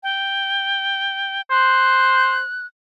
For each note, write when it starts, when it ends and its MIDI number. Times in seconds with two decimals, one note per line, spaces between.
0.03 1.42 79
1.51 2.41 72
1.51 2.66 90